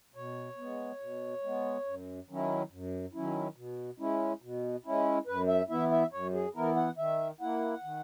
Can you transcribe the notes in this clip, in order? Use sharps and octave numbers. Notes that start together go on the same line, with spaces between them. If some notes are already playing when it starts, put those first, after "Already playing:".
B2 C#5
G#3 B3
B2
G#3 B3
F#2
D#3 F#3 C#4 E4
F#2
D#3 F#3 C#4 E4
B2
G#3 C#4 E4
B2
G#3 C#4 E4
F#2 B4
E5
E3 B3 E4 E5
E5
F#2 C#5
G#4
E3 B3 E4 A#4
F#5
D#3 E5
A#3 E4 F#5
D#3